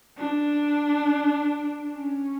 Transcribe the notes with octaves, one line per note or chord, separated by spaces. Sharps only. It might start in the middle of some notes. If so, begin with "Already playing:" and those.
D4
C#4